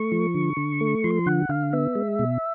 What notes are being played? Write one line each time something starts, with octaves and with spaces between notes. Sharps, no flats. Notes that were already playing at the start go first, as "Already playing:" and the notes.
Already playing: A3 C#6
F3
D3
D3
A3
F3 C6
D3 F#5
D3 F5
B3 E5
G#3
B2